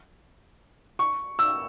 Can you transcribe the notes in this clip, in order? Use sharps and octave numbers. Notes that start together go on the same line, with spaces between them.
C#6
E6